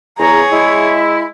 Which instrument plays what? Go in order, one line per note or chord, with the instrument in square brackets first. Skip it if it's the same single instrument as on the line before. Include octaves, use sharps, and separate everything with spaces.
[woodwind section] E2 A#5 [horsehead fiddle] G#4 C#5
[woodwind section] G#3 E4